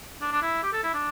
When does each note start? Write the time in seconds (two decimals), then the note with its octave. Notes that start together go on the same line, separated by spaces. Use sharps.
0.21 D4
0.32 D4
0.42 E4
0.63 G4
0.73 A4
0.83 E4
0.94 D4